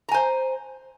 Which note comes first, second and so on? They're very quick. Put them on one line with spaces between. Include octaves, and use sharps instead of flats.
A#5 G#5 C5